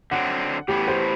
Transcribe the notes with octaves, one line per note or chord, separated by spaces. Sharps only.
D3 F#3 C4 F#5
A2 E3 B3 G4
C5